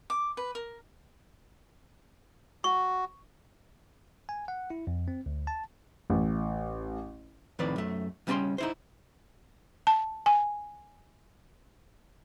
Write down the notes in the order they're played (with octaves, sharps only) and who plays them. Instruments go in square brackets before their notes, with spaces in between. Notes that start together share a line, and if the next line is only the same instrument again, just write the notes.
[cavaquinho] D6
B4
A#4
[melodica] F#4 [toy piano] C#6
[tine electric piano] G#5
F#5
E4
F2
C4
D2
A5
[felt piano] A1
[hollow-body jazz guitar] F2 A2 D#3 C4 B4 D5
F#2 A3
C#2 G3 C#4 A#4 G5 C6
D#4 E4 C5
[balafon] A5
G#5